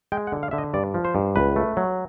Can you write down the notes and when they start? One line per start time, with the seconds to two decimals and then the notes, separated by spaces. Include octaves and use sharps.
0.12 G#3 G5
0.27 F#5
0.32 D3
0.43 F5
0.51 D3 E5
0.58 D#5
0.74 G2 D5
0.94 F3
1.05 C5
1.15 G2
1.36 C#2 B4
1.56 A3
1.77 F#3